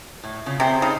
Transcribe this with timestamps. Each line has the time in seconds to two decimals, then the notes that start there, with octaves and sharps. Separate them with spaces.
0.23 A2
0.46 C#3 F4
0.60 C3 G#4 C5
0.82 C#3 D#4